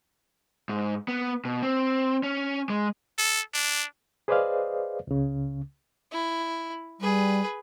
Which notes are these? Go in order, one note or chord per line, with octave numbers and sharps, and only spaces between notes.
G#2
B3
B2
C4
C#4
G#3
A4
D4
G#4 B4 C5 D5 D#5 F5
C#2 C#3
E4
G3 G#4 B4